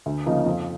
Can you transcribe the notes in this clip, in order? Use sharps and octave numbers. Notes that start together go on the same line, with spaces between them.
D2
C#3 F3 A#3 D#4
F2